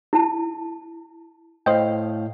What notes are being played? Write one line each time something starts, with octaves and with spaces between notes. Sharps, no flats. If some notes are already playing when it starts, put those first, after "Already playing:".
E4 A5
A2 C5 D#5 F5 G5